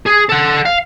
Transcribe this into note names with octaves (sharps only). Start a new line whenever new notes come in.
G#4
A4 F#5
F5